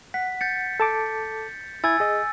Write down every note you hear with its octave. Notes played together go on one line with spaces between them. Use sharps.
F#5 B6
G6 A6 C#7
A4 A5 D6
E4 G#5 E6 G#6 A6
G#4 D#5